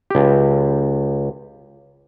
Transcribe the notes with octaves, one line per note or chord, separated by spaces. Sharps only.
C#2 G4